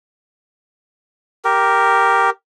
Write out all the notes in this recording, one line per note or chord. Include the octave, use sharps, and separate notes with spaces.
G4 A#4